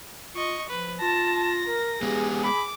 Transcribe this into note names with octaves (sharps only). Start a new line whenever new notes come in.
F4 D#5 C#6
F3 B4
F4 A5 A#6
A#4
G#3 B3 G4 G#4
B5 D6